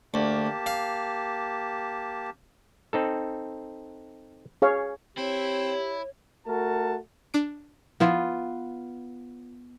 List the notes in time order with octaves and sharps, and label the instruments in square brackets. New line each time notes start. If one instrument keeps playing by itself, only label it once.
[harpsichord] D2 [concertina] A#3 G4 A5
[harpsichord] F5
[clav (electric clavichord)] C4 D#4 A4
[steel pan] G#4 C#5 F5
[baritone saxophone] C4 [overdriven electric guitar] E4 [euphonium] G4 [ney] C#5
[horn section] A3 F#4 A#4 A5
[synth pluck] D4 D7
[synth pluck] F3 E4 [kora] B3 F4